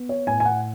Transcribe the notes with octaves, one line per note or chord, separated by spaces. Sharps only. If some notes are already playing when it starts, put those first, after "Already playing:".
Already playing: B3
C#5
A2 G#5
G#5
F#5